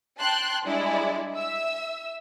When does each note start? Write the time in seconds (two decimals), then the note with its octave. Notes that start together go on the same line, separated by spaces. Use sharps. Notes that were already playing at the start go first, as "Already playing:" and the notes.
0.19 G5 A5 C6 F#6
0.64 G3 G#3 D4 E4 D5
1.35 E5 E6